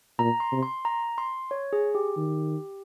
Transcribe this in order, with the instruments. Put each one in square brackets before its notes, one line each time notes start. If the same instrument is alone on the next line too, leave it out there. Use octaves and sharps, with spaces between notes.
[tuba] A#2 [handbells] A#5
[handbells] C6
[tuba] C3
[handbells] C6
A#5
C6
C#5
G#4
G4
[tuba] D#3